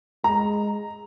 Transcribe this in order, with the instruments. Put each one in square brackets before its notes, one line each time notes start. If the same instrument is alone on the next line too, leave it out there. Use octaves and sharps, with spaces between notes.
[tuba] G#3 [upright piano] A#5